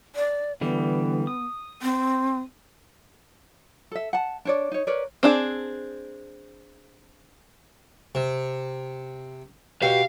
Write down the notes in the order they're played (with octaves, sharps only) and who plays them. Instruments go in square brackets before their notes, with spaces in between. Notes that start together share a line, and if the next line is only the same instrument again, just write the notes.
[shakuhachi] D5
[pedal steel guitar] D3 E3 G3 [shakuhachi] B3
[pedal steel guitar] D#6
[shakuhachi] C4
[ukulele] A4 E5
F#5 A5
D4 C#5 D5
D#4 C#5
A#4 B4 C#5 D5
[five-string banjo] C4 D4 G#4
[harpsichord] C3
[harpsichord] B2 [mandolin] G4 [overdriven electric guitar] F5